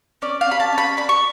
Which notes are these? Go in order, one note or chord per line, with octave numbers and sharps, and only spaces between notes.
C#4 D5
F5
C#4 B5
A5
C#4
B5
D4 B5
C#6